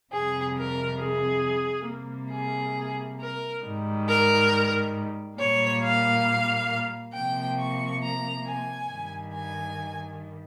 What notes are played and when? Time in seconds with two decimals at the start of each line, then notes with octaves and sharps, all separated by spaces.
0.12 F2 C3 G3 G#4
0.57 A#4
1.00 G#4
1.87 C3 G3 A#3
2.31 G#4
3.20 A#4
3.63 G#2 D#3 G3
4.08 A#4
5.38 A#2 G3 A#3 C#5
5.83 F5
7.14 C3 F3 A#3 G5
7.58 C#6
8.02 A#5
8.46 G#5
8.90 G2 D#3 G3
9.33 G#5